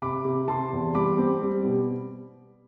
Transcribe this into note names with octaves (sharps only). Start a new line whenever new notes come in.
C3 B5 D6
C3
C3 A5 C6
E2
G3 B5 D6
C4
G3
B2